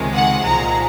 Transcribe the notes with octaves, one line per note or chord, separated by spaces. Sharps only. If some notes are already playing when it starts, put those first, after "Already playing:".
Already playing: C#2 C3 D#3 G#3
F#5
C2 A#2 F3 G#3 A#5